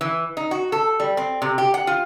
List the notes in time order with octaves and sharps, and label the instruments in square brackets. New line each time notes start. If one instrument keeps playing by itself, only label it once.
[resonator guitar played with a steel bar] E3
D#4
F#4
A4
G3
C4
C3
G4
F#5
F4